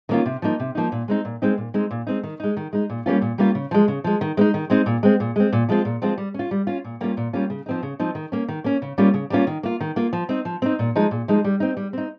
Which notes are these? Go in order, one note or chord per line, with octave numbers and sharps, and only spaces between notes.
D#3 A#3 C#4 F4
C3
F3 A#3 D#4
C3
F3 A#3 D#4
A#2
G#3 C4 D#4
A#2
G#3 C4 D#4
A#2
G#3 C4 D#4
A#2
G#3 C4 D#4
D#3
G#3 D#4
D#3
G#3 D#4
A#2
G3 A#3 C#4 F4
A#2
G3 A#3 C#4 F4
C#3
F3 G#3
C#3
F3 G#3
D#3
G#3 C4 D#4
D#3
G#3 C4 D#4
A#2
G#3 C4
A#2
G#3 C4
A#2
F3 G#3 C4 F4
A#2
F3 G#3 C4 F4
G3
C#4 F4
G3
C#4 F4
A#2
G3 A#3 C#4 F4
A#2
G3 A#3 C#4 F4
C#3
F3 C4 D#4
C#3
F3 C4 D#4
D#3
A#3 C#4
D#3
A#3 C#4
C#3
G3 A#3 C#4 F4
C#3
G3 A#3 C#4 F4
D#3
A#3 F4
D#3
A#3 F4
F3
C4 D#4
F3
C4 D#4
A#2
F3 G#3 D#4
A#2
F3 G#3 D#4
G3
C4 D#4
G3
C4 D#4